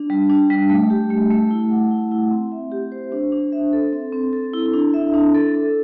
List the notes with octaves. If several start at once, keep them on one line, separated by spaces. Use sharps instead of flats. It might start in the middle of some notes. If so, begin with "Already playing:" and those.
Already playing: D4
G3
D4
G3
A3
G4
A3
A3
E4
F#5
E4
E4
C4
E5
G4
C5
D4
D4
E5
A4
C4
C4
A4
E4
D4
E5
D4
A4
A4